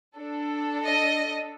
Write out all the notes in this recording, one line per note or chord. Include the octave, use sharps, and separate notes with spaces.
D4 A4
D#5